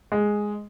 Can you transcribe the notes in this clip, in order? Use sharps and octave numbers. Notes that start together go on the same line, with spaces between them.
G#3